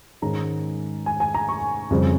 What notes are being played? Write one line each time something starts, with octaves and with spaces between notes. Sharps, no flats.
G#2 D#3 G#3 C#4 A#5
G#5
G#5
A#5
C#6
F2 C#3 G3 C4